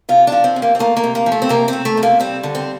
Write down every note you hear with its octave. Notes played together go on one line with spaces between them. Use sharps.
C3 F4
F3 D4
C4
C3
A#3
C4
A3 A#3
A#3
C3
A#3
F3
A3
C4
C3 A#3
A3 C4
A3
C3
A#3
G3 C4
D3
C4